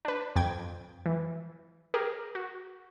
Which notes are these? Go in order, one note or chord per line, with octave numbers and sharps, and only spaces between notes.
D4 B4
F2 G5 G#6
E3
G4 G#4 A#4
F#4